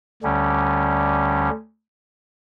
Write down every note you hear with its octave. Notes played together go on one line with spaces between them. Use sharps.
D2 D3 G3 C#4